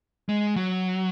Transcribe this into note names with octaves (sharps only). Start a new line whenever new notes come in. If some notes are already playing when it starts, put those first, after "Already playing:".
G#3
F#3